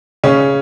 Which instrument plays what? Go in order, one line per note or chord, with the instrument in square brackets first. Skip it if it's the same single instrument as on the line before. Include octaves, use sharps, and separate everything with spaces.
[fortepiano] C#3 [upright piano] C#4